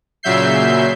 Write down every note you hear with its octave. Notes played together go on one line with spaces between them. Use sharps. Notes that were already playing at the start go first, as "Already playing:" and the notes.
A#2 C#3 F#3 E5 G6 C7